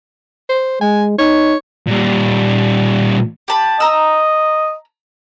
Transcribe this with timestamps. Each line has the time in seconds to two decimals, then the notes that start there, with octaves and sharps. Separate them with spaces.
0.49 C5
0.81 G#3 G#5
1.19 D#4 C#5
1.87 A#2 G3
3.48 G4 A5 B5
3.80 D#5 A#5 E6